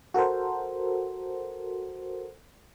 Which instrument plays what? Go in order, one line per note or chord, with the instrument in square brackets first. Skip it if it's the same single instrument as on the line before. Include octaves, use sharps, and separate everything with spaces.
[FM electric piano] F#4 A4 A#4 C5